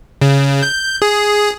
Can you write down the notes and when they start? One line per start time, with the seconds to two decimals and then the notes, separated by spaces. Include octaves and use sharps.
0.21 C#3
0.63 G6
1.02 G#4